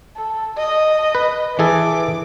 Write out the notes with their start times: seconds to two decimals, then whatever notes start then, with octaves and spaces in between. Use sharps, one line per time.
0.16 A4
0.57 D#5
1.15 B4
1.59 E3 G#4 A4 D6